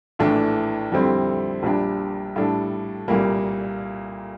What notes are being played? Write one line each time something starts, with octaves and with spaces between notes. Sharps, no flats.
A#1 A2 E3 A3 D4
F2 D3 G3 C4 E4
A#1 A#2 G3 D4
A2 G3 D4 A4
C2 A#2 G3 A#3